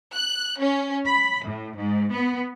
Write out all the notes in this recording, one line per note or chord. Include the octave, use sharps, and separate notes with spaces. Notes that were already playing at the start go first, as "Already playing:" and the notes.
F#6
C#4
B5
A2
G#2
B3